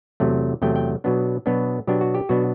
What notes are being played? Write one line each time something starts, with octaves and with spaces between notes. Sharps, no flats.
E2 C3 F#3 A3
E2 C3 F#3 A3 G5
G5
B2 F#3 B3 D4
B2 F#3 B3 D4
B2 F#3 B3 D4 G4
F#4
G4
B2 F#3 B3 D4 F#4